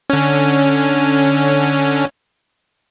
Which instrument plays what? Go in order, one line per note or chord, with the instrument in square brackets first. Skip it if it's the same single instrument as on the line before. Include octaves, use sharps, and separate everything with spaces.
[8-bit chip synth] D3 C#4